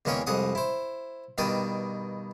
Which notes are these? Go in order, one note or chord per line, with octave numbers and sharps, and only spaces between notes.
E2 G#3 A#3 C#4 C#5 G5
C2 F2 G#3 F#5 D#6
E4 C5
G2 B2 D#3 D5 G5 D#6